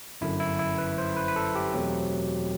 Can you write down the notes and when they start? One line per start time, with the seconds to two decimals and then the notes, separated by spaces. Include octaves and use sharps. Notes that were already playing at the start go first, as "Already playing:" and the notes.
0.21 G1 F#2 D3 E4
0.40 E4
0.59 E4
0.78 B4
0.98 C5
1.17 B4
1.28 B4
1.36 A4
1.55 G4
1.73 E2 B2 F#3 A3 C4